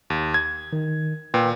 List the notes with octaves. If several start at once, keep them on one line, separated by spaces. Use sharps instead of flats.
D#2
G#6
D#3
A#2 B4 G5